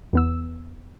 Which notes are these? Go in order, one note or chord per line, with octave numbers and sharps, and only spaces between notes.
E2 B3 E6